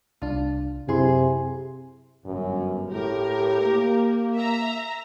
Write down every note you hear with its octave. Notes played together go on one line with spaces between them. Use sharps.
C2 D4 F4
F#2 C3 E4 G#4 C6
G1 F#2
A2 G4 A#4
A#3
E5 A#5